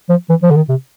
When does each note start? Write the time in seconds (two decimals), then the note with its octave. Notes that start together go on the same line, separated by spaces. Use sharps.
0.09 F3
0.29 E3
0.43 F3
0.51 D3
0.56 D#3
0.69 C3